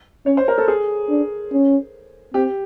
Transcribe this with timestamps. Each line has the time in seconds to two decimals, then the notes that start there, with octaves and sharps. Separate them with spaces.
0.26 C#4 C#5
0.37 C5
0.48 A#4
0.58 A4
0.68 G#4
1.09 D4
1.52 C#4
2.34 C4 G4